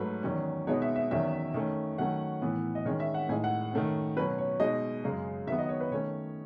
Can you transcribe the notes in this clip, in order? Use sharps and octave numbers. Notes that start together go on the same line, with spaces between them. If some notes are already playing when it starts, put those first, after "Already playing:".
Already playing: G#2 F#3 A3 B4
E2 D#3 F#3 C#4
B2 G#3 B3 D#4 C#5
E5
E5
E2 D#3 F#3 C#4 E5
D#3 A3 C#4
D#3 F#3 A3 C#4 F#5
A2 E3 B3
D#5
D#3 G#3 C#4 C#5
E5
F#5
A2 G#3 D#4 G#5
F#5
D#3 A3 C#4
B2 F#3 C#4 B4
C#5
B2 G#3 D#4 D#5
F#2 C#3 G#3
D#3 F#3 B3 E5
D#5
C#5
B4
D#3 A3 C#4 C#5